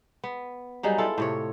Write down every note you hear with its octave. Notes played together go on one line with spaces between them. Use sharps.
B3
F#3 G3 D#4 G#4
E4 F4 A4
A2 C3 C#5